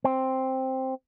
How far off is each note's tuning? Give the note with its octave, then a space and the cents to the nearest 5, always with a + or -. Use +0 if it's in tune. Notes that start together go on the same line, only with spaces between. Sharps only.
C4 +5